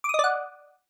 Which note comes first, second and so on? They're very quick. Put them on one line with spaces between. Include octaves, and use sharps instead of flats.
D6 D#6 D#5 D5 F#5